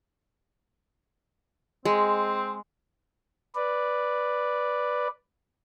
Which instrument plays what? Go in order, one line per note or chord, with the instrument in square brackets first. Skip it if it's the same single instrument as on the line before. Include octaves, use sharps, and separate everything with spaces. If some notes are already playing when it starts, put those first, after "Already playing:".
[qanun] G#3 [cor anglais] C4
[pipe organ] B4 D5